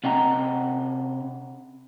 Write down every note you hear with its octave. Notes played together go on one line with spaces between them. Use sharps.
C3 C#4 D#5 F#5 G5 A#5